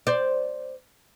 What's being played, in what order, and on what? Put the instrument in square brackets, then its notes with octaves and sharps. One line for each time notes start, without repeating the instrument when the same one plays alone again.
[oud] C5 D5